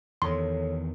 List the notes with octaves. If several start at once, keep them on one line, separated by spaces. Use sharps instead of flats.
E2 D#3 A4 C#5 C6